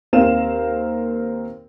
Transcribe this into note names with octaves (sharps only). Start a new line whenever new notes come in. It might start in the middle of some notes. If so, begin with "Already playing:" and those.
D#2 C4 A#4 C5 F5 E7